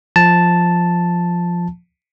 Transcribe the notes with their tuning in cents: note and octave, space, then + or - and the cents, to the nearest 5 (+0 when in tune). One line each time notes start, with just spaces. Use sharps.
F3 +0 A5 +0